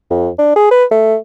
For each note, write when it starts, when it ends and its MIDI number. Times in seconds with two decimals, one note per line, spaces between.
0.10 0.29 41
0.39 0.53 62
0.56 0.71 68
0.71 0.84 71
0.91 1.17 57